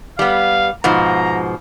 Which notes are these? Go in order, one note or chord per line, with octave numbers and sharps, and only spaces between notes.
G3 B3 F5
G#2 B2 F3 A#5